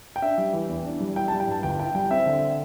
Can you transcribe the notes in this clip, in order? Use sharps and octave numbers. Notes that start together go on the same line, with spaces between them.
G5
D4 E5
G3
E3
E2
D4
G3
E4 G5
A5
G3
G5
G2 A5
G1 G5
E4 G5
G3 G5
C4 E5
D3